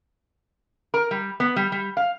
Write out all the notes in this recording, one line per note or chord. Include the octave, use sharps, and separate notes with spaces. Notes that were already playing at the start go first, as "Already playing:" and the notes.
A#4
G3
B3
G3
G3
F5